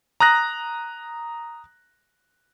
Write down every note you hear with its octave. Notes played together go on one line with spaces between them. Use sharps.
A#5 D#6 F#6 A#6